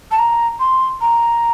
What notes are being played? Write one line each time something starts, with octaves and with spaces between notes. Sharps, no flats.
A5
A#5
C6
A#5